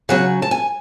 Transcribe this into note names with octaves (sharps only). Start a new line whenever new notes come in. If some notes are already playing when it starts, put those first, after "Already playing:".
C#3 F#3 C#4 F#5
A5
G#5